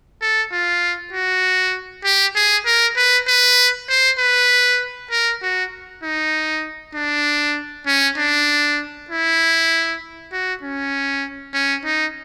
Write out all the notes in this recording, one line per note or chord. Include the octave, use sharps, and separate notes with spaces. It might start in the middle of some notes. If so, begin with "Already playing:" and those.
A4
F4
F#4
G4
G#4
A#4
B4
B4
C5
B4
A#4
F#4
D#4
D4
C#4
D4
E4
F#4
C#4
C#4
D#4